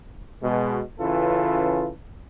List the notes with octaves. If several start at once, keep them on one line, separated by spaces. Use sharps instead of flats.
B2 G#3
C#3 E3 C#4 F4 A4 B4